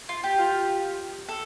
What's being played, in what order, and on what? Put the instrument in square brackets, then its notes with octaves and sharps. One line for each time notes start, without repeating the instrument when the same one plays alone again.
[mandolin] F4
G4
[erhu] F4
[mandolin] A4